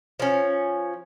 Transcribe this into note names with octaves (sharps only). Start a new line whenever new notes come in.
F3 C#4